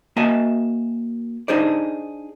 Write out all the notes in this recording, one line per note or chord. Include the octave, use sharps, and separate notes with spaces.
A#3 F#4 D#5 E5 G#5 A5
D4 D#4 G#4 C5 D5